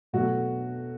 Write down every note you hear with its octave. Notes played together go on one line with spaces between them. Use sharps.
B2 F#3 A3 F#4